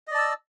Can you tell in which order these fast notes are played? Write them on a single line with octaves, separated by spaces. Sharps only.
D#5 D5 A5 E6